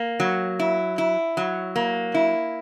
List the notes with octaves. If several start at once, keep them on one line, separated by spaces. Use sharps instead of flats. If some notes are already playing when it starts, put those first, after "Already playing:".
Already playing: A#3
F#3
E4
E4
F#3
A#3
E4